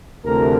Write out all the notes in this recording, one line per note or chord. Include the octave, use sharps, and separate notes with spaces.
D2 C3 E3 A3 A#4